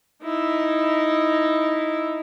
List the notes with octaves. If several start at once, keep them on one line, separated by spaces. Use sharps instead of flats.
D#4 E4